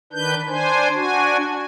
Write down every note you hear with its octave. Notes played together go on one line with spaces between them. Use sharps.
D#3 D4 B4 G6
D4 C5 G#5
D4 F#4 G#5